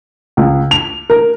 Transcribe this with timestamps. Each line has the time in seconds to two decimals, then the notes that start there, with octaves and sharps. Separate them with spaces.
0.37 C#2
0.71 F7
1.10 A#4